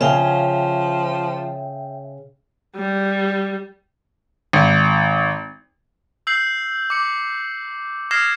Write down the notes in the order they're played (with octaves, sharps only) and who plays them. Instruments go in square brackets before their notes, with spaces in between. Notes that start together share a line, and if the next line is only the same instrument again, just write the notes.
[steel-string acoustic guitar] C#3 C#4 [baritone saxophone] F3 [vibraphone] E5 G5
[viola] G3
[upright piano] G#1
[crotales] E6 G6 C7 F#7
D6 C#7
D#6 F6 G#6 A#6 C7 E7